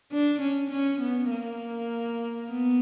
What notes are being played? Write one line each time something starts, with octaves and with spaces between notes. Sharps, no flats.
D4
C#4
C#4
B3
A#3
B3